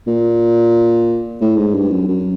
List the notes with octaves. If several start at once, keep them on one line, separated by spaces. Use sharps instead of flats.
A#2
A2
G#2
G2
F#2
F#2